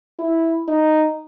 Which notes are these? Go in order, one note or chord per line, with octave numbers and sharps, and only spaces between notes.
E4
D#4